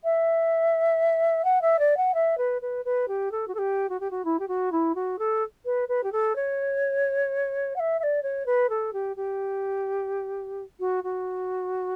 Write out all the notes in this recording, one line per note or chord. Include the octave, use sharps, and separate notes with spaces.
E5
F#5
E5
D5
F#5
E5
B4
B4
B4
G4
A4
F#4
A4
G4
F#4
G4
F#4
E4
G4
F#4
E4
F#4
A4
B4
B4
G4
A4
C#5
F#5
E5
E5
D5
C#5
B4
A4
G4
G4
F#4
F#4